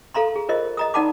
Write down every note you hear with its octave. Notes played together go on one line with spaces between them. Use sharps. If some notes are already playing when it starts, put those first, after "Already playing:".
A4 F5 A#5 C6
G#4
F4 A#4 C5 D#5
D#5 A#5 D#6
D#4 D5 F#5 A5 B5 D6